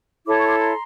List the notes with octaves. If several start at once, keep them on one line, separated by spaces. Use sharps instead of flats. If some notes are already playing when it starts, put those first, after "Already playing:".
E4 A4 C#5 D6
C#6
C6 D6
A#5 C6